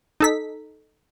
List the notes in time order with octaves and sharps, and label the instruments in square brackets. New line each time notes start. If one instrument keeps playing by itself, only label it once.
[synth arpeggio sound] D#4 A4 B6